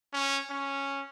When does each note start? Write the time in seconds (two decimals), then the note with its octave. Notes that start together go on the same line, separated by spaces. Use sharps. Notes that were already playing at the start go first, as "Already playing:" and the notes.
0.13 C#4
0.50 C#4